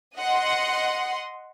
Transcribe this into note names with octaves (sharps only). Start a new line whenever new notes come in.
D#5 F#5 C6